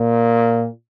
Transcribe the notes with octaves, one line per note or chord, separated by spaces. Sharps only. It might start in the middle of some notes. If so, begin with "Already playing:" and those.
Already playing: A#2